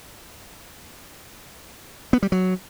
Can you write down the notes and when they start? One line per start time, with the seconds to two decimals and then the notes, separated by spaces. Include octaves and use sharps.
2.13 B3
2.23 G3
2.32 F#3